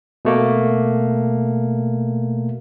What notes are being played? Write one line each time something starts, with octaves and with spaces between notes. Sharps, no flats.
B2 A3 A#3